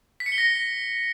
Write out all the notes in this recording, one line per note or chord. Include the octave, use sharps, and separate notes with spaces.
B6
C#7
G7
A#6